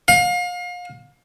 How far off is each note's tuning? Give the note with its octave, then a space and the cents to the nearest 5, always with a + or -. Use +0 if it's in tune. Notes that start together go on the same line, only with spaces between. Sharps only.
F5 +35